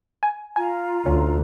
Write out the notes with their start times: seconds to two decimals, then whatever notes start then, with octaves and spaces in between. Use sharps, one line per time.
0.23 G#5
0.56 F4 G#5 A#5
1.06 D2 C#4